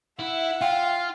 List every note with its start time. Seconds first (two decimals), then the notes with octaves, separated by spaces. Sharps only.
0.19 E4 E5 F#5
0.61 F4 F5 G5